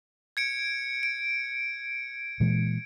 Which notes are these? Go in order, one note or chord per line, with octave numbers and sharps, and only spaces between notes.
G#6 C#7 D7
D7
A#2 E3 G#3